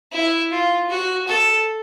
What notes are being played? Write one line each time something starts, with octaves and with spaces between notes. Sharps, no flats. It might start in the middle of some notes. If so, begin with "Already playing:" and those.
E4
F4
F#4
A4